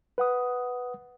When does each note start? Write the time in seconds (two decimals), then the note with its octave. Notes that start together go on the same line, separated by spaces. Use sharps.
0.18 B4 F#5 D#6